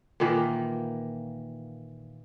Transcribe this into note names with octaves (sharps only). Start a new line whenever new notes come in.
A#2 D#3 E3 A#3